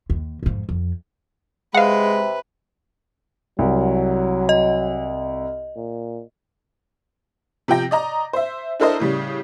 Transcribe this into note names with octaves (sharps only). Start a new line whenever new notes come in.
D#2
F2 G#2
F2
C3 G#3 B4 F5 F#5
C2 F#3
D#5
A#2
C3 F3 G5 A#6
D5 D#5 A#5
C5 E5
D4 E4 A4 A#4 C5 D#5
A2 C#3 G3